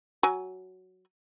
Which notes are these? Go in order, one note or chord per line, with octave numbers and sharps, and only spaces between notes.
F#3 G#5